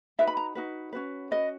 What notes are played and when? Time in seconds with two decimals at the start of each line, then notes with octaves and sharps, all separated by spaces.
0.19 D#4 F#4 B4 E5
0.27 B5
0.37 A#5
0.55 D#4 F#4 B4
0.93 C#4 F#4 B4
1.31 C#4 F#4 B4 D#5